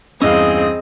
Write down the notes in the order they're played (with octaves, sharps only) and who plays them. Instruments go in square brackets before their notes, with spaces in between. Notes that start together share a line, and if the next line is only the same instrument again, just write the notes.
[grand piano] E2 G2 E6 [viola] C4 G#4 [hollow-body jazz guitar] C#4 F5 [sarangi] D#5